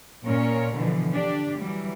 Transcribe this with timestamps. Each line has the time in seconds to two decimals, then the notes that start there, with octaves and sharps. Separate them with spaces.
0.25 A#2 C#4 A#4 C#5
0.75 B2 D3 E3 F3
1.13 D4 G4
1.59 E3 F#3 G3